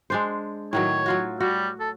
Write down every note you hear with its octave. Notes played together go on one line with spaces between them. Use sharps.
G#3 D4 C5
A2 D#3 F#3 C#5
F#3 F4 F#4
G3 F#4
A4